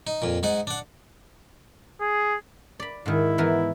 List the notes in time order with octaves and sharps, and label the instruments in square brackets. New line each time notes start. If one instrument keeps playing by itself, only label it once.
[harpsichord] D#4
F2 A#2
G#2 D#4 F#5
D4 F#5
[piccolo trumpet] G#4
[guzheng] D5 B5
[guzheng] G#2 D#3 [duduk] E4
[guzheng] E3 B3 A#4